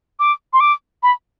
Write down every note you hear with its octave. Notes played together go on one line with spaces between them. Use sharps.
D6
C6
D6
B5